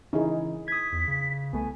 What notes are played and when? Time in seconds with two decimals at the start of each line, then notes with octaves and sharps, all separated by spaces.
0.13 C#3 E3 C#4 D#4 E4 G#4
0.68 D#6 G#6 B6
0.92 E2
1.08 C#3
1.53 C2 A3 B3 G#5